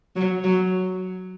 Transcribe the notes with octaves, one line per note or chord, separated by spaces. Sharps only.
F#3
F#3